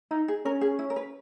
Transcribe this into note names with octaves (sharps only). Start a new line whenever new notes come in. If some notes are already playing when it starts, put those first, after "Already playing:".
D#4 E4
G#4
C#4 A#4
G#4
E4
A#4
B4